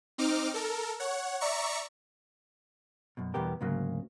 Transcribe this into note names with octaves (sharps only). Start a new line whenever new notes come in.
C4 D#4 D6 F6
A4 A#4
C#5 F#5
D5 E5 A#5 C#6 C#7
F#2 B2
E2 B2 G3 B3 G4 A#4
D2 G#2 C#3 F#3 A#3